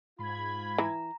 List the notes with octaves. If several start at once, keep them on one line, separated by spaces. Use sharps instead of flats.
G#2 F4 B5 G#6
E3 A#5